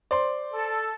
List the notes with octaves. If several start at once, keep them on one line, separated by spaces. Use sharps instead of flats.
C5 D5 C6
A4